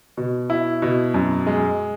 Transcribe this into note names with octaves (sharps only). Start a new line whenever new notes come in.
B2
E4
B2
F#2
G#3